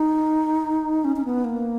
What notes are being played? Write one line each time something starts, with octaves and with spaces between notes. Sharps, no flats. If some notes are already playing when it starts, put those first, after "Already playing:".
Already playing: D#4
C#4
C#4
B3
A#3